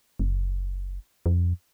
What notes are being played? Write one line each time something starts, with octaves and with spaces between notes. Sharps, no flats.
F#1
F2